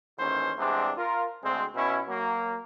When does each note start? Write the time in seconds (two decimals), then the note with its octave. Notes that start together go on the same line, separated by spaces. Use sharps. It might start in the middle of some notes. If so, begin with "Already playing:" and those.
0.18 A1 D#2 G#2 E3 C#4 C5
0.58 E2 C3 G3 G#3 C4 D4
0.97 F4 A#4
1.43 D2 G#3 C4
1.75 B2 C#4 E4
2.08 F#3 A#3